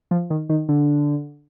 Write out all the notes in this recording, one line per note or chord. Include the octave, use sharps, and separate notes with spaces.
F3
D#3
D#3
D3